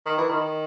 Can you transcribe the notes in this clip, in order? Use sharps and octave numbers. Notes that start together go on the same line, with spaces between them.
D#3
E3
D#3